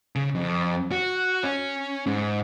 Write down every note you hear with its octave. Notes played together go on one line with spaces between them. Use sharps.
C#3
F2
F#4
C#4
G#2